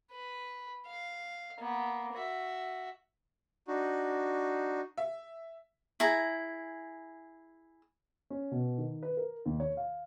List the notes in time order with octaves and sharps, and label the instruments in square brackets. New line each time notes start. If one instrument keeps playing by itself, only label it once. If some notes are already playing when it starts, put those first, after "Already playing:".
[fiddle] B4
F5
A#3 B3
F#4 E5
[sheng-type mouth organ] D4 D#4 F#4
[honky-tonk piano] E5
[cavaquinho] E4 G#4 A#5
[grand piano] C#4
B2
D#3
B4
A#4
D#2
C#5
F5